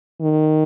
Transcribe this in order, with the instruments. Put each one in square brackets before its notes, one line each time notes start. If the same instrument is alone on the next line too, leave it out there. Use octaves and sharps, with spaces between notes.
[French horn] D#3